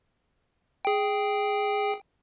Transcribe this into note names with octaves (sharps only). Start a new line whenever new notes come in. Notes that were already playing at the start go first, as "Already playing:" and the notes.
G#4 G5